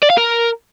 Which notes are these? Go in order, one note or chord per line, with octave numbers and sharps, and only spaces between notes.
D5
F5
A#4